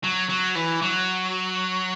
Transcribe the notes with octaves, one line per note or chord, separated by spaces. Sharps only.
F#3
F#3
E3
F#3